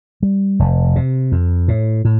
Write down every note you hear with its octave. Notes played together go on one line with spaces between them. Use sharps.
G3
F1
C3
F2
A2
A2